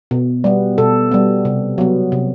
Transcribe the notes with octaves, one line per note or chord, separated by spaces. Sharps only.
B2
G3 B3
B2 A4
G3 B3
C3
F#3 B3
C3